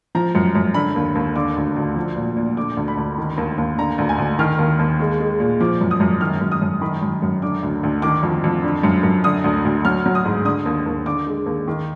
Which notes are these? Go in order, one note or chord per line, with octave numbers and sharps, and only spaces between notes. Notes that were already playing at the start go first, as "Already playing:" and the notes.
F3 A#5
F#2
F#2
D3 B5
D#2
D#2
D3 D6
D2
D2
F3
A#2
A#2
D3 D6
D2
B5
D2
D#3
D#2
D#2
D3 A#5
D2
G#5
D2
D#3 F6
D#2
D#2
G#3
G#3
A#2
F3 D6
F#2
D#6
F#2
D#3 F6
F#2
D#6
F#2
D#3 B5
F#2
F#2
D3 D6
D2
D2
D#3 D6
F2
F2
D3
F#2
F#2
D3 D#6
D2
D2
F#3 F6
F#3
D#6
G#2
D3 D#6
D#2
D#2
D3 D6
G#3
D#2
D#3